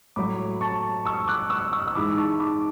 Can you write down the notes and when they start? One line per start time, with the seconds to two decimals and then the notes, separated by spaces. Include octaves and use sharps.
0.16 A2 F#3 B5 D6
0.61 A5 C#6
1.06 C#6 E6
1.28 D6 F#6
1.50 C#6 E6
1.73 C#6 E6
1.87 E6
1.95 G#2 E3 B5 D6
2.17 A5 C#6
2.40 B5 D6